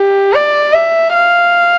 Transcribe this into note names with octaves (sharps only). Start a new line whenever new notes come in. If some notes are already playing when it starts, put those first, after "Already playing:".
Already playing: G4
D5
E5
F5